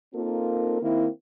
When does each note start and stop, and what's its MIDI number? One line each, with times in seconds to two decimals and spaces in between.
0.15 0.81 58
0.15 0.81 60
0.15 0.81 63
0.15 0.81 65
0.15 0.81 69
0.15 0.81 70
0.82 1.08 51
0.82 1.08 58
0.82 1.08 60
0.82 1.08 64